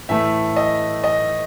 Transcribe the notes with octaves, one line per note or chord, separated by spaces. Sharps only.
A2 E3 A3 E5
D#5
D#5